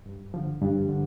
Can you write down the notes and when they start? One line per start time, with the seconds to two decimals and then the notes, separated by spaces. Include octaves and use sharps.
0.06 G2
0.34 D3 F3
0.61 G2
0.89 D3